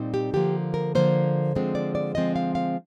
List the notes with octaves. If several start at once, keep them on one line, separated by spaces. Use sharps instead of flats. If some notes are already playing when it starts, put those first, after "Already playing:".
Already playing: A#2 G3 C4 D#4
G4
D3 F3 A#3 G4
A#4
D3 F3 A#3 C5
D3 F3 G#3 C4
D5
D5
D3 F3 G#3 C4 D#5
F5
F5